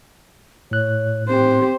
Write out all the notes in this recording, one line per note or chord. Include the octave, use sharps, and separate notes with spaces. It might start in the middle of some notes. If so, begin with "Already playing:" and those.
A2 C#5 F#6
C4 G4 C5